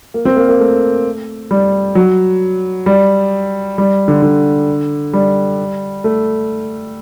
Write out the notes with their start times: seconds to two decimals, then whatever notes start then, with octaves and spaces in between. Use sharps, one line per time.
0.14 A#3
0.25 C4
0.37 A#3
0.49 A#3
0.60 A3
1.51 G3
1.95 F#3
2.86 G3
3.78 G3
4.08 D3
4.22 D3
5.13 G3
6.04 A3